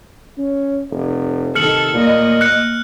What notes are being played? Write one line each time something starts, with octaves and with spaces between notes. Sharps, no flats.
C#4
F1
C3 D#3 A4 F6 C#7 F#7
A#2 A3 A#3 D#5
F#6 C#7